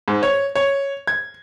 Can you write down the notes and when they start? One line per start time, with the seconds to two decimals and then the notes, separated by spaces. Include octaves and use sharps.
0.08 G#2
0.23 C#5
0.55 C#5
1.07 G#6